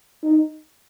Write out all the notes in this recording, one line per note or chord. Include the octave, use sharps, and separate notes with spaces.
D#4